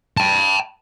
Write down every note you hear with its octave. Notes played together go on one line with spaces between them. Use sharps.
G5 A5